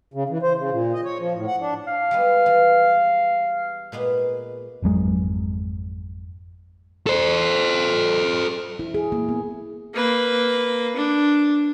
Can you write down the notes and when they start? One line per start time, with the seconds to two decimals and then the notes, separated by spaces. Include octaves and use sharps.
0.14 C#3
0.29 E3
0.43 C5
0.57 C#3
0.71 A#2
0.93 D#5
1.04 C#5
1.19 F3
1.35 A2
1.47 F#5
1.60 D4
1.87 F5
2.11 G3 G#3 B3
2.46 E3
3.92 A#2 G#3 B3
4.82 G#1 F2 F#3 G#3
7.07 A4 C5
8.79 E4
8.94 G#4
9.12 A#3
9.29 B3
9.94 A#3 B4
10.96 D4